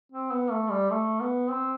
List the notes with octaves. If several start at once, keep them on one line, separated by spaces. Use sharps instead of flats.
C4
B3
A3
G3
A3
B3
C4